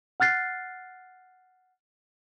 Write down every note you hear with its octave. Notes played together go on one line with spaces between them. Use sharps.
F#5 F6 F#6 A6 C7